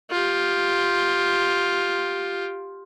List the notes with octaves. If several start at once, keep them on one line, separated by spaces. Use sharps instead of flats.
F4 G4